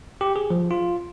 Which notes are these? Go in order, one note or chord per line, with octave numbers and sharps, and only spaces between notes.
G4
G#4
F3
F4